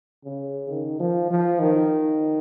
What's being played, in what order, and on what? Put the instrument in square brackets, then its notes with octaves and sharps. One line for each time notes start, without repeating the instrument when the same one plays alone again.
[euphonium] C#3
D#3
F3
F3
D#3